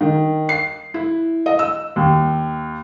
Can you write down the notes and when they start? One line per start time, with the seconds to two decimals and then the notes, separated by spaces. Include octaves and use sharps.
0.01 D#3
0.49 C7
0.94 E4
1.46 D#5
1.59 E6
1.96 D#2